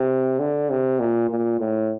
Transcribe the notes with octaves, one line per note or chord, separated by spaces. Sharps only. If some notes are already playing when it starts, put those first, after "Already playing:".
Already playing: C3
D3
C3
A#2
A#2
A2